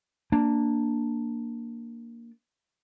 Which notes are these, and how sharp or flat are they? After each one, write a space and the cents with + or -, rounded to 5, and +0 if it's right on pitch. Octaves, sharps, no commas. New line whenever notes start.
A#3 +0 D4 +0